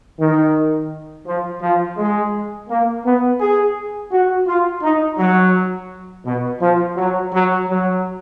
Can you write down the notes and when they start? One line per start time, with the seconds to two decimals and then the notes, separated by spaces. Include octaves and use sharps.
0.20 D#3
1.26 F3
1.62 F3
1.97 G#3
2.69 A#3
3.05 B3
3.41 G#4
4.12 F#4
4.47 F4
4.83 D#4
5.18 F#3
6.26 B2
6.61 F3
6.96 F#3
7.33 F#3
7.68 F#3